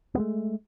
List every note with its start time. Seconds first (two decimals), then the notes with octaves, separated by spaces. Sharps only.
0.15 B3
0.17 G#3
0.20 A3